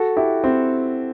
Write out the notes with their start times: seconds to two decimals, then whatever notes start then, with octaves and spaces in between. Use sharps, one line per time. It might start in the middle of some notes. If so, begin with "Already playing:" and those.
Already playing: F#4 A4
0.17 E4 G4
0.44 C4 E4